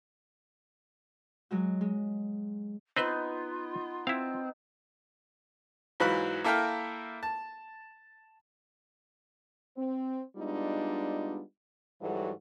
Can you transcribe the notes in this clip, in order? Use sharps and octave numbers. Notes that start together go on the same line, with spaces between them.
F#3 G#3 F#4
G#3
B3 C4 D#4 F4 B4 C5
C4 E4 F5
G#2 E3 F#3 F4 B5 F#6
A#3 E4 A4 A#4 F5 G5
A5
C4
G3 G#3 B3 D4 D#4 F4
G#2 E3 F#3 G3 F#4 A4